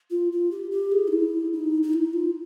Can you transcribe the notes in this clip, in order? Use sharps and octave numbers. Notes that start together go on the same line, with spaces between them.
F4
F4
G4
G4
G#4
D#4
E4
D#4
D#4
E4
F4